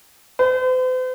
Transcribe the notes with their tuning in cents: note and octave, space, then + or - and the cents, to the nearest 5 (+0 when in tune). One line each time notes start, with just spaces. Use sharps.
C5 -45